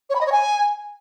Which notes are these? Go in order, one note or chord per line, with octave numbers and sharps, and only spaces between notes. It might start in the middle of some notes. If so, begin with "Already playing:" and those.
C#5
B5
D#5
C#5
G#5